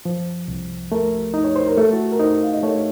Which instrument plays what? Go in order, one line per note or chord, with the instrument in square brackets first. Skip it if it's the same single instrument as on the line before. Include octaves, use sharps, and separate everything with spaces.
[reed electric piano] F3 [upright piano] C5
[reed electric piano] C2
[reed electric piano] A3 [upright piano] A#4
[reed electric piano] D#4
[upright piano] C#5
C5
A#4
[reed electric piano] A3 [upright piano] A4
[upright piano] F#4
A4
A#4
[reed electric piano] D#4 [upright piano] C5
[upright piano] F5
D#5
[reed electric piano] A3 [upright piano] C#5